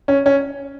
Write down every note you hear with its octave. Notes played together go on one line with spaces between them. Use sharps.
C#4
C#4